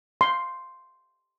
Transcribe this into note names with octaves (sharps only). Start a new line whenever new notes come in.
C6